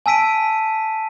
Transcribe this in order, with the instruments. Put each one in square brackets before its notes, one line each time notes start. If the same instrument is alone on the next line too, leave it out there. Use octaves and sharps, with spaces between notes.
[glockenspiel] G#5 A5 E6 B6 D7 D#7